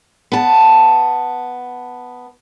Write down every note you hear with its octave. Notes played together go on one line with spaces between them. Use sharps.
B3 A5